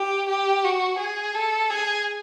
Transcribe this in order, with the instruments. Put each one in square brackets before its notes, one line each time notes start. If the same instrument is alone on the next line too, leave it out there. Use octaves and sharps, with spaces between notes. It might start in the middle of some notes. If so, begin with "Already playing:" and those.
Already playing: [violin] G4
G4
F#4
G#4
A4
G#4